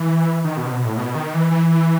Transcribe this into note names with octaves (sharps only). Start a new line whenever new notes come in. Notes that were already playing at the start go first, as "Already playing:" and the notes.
Already playing: E3
D#3
B2
C3
B2
A2
B2
D#3
E3
E3